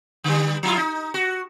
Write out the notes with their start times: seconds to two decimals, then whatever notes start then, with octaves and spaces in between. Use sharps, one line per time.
0.24 D3 G3
0.63 F3 E4 F4
0.77 D#4
1.14 F#4